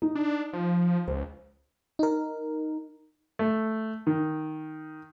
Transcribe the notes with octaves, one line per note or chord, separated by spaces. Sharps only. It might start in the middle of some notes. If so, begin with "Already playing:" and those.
D#4
D4
F3
C#2 C5
D#4 A#4
A3
D#3